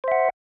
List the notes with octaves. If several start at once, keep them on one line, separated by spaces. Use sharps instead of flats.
C5 E5 F#5